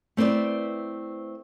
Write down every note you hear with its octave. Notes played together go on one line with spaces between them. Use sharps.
A3 C4 E4 B4 D5